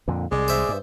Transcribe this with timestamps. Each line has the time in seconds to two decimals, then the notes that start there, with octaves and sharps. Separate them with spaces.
0.08 F2 A#2 D3
0.31 C2 G#3 G#4 D5
0.48 C5 E5
0.69 G2